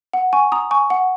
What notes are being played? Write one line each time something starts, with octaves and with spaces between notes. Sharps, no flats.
F#5
G#5 C#6
A#5 D#6
G#5 C#6
F#5